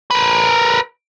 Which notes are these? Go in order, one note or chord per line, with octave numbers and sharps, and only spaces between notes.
A#4 B4